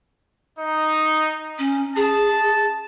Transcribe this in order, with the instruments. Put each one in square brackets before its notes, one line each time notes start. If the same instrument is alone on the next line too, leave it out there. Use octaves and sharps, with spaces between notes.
[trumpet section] D#4
[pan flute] C#4
[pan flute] G#4 [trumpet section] A5